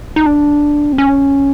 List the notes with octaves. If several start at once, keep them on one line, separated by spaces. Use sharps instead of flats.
D#4
D4
C4
C#4